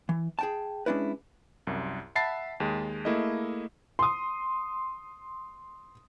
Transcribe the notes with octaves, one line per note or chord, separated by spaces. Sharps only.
E3
G#4 G5 A5
G#3 C#4 D4 E4 B4
C2 F#2
E5 F#5 A5 B5 A6 C7
D#2 G#3
A3 A#3 E4 G#4 D#5
C6 D#6